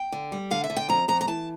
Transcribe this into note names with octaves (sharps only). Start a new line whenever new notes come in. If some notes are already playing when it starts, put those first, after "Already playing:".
Already playing: G5
D3
G3
D3 F5
E5
D3
G5
F2 A#5
F2 A#5
A#5
E3 A5